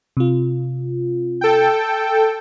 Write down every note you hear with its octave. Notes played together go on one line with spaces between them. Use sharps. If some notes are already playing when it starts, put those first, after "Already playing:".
C3 F4
A4 G5